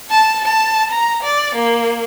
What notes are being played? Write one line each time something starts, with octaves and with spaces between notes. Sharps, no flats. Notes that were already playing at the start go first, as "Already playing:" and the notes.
A5
A5
A#5
D5
A#3